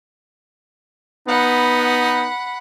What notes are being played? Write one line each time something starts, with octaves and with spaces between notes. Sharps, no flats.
B3 D#4 F#5 B5